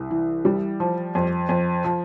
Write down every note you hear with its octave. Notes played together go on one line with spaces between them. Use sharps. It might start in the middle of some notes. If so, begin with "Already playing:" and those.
Already playing: C2
E3
G3
F3
F2
F2
F3